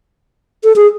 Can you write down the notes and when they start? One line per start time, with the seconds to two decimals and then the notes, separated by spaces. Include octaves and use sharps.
0.64 A4
0.76 G#4